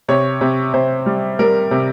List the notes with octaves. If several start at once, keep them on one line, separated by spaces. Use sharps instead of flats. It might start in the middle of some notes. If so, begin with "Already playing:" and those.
C3 C#5
C3
C3 C5
G3
G3 A#4
C3